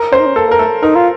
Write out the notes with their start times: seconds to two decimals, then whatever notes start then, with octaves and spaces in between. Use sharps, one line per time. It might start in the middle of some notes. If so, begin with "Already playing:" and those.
Already playing: A#4
0.12 C#4 C5
0.20 D#4
0.26 C#4
0.36 A#3 A4
0.47 A#3 A#4
0.59 A3 A4
0.83 D#4 A#4
0.96 F4